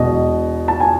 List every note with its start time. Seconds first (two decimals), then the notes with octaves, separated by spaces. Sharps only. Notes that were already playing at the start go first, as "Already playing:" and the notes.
Already playing: E1 E2 B2 D#5
0.68 A5
0.80 G#5